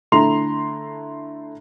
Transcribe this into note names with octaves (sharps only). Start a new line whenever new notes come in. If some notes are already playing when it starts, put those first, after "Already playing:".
D3 A3 E4 A#5 C6 F7